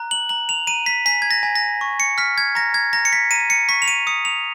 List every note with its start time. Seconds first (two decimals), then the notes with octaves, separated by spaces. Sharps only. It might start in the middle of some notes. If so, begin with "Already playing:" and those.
Already playing: A#5 F#6
0.11 F#7
0.29 A#5 F#7
0.49 F7
0.67 A#5 D#7
0.86 B6
1.06 G#5 B6
1.22 G#6
1.31 A#6
1.43 G#5
1.55 A#6
1.81 C#6
2.00 C#7
2.18 F6 B6
2.38 G#6
2.55 A#5 A#6
2.74 G#6
2.93 A#5 A#6
3.05 C#7
3.13 B6
3.31 A#5 D#7
3.50 C#7
3.69 C#6 B6
3.82 F7
3.88 D#7
4.07 D#6 C#7
4.25 F7